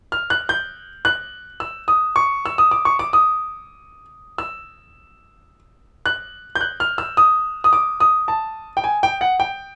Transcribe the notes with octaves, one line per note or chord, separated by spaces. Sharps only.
F6
F#6
G6
F#6
E6
D#6
C#6
E6
D#6
D6
C#6
D6
D#6
E6
F#6
G6
F#6
F6
E6
D#6
D#6
D6
D#6
A5
G5
G#5
G5
F#5
G5